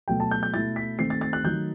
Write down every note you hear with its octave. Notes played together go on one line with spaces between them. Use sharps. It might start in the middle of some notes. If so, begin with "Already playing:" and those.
B2 F#3 A3 G5
A5
G6
G6
B2 A3 E4 A6
B6
D#3 A3 C4 C7
A6
A6
F#6
D#3 F#3 A3 D#4 G6